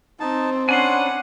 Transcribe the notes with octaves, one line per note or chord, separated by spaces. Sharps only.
C4 D#4 A5
C#4 D4 F#5 G#5 B5 C6